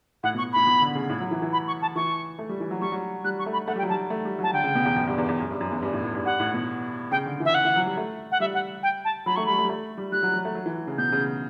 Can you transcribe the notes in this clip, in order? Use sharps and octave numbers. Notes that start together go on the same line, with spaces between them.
A2 F#5
B2
C#6
A2 B5
B2
D3
C#3
A2
F#3
E3
E3
B5
C#6
A5
E3 C#6
A3
G3
E3
F#3
G3 C#6
F#3
G3 F#6
C#6
A3
B5
A3 F#5
G3 G5
F#3
G3 A5
A3
G3
F#3 A5
D3 G5
C#3
B2
E2
F#2
G2
E2
E2
F#2
G2
F#2
E2
G2
A2
A2
G2
G2 F#5
A2
B2
C#3 G5
D3
E3
E5
F#5
E3
F#3
G3
A3
F#5
G3 E5
F#5
G5
A5
F#3 B5
A3 C#6
G3 B5
A3
G3
A3
G3
G3 F#6
F#3
F#3
A3
F#3
E3
C#3
B2 G6
C#3